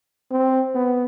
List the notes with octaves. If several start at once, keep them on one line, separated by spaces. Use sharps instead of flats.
C4
B3